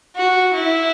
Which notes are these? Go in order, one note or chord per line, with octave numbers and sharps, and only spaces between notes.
F#4
E4